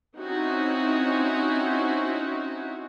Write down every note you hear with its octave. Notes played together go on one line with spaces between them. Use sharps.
C4 C#4 D#4 E4 F#4